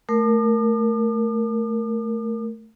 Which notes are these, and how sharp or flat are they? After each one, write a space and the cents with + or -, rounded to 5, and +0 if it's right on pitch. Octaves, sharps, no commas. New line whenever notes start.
A3 +0 A#4 +0 D6 +45